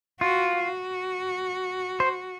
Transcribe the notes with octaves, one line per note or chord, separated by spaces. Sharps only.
F4 F#4
F#4
C5